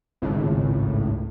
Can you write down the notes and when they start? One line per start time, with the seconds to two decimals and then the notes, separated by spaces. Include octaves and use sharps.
0.22 G#1 C#2 A2